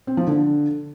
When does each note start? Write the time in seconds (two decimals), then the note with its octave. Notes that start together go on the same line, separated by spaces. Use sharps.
0.07 C4
0.17 F3
0.27 D3